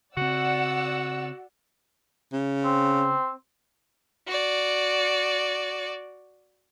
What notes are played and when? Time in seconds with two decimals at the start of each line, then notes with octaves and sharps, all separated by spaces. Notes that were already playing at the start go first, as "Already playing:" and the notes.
0.17 C#3 C4 F#4 D5 F#5 E6
2.33 C#3
2.64 C4
4.27 F#4 D5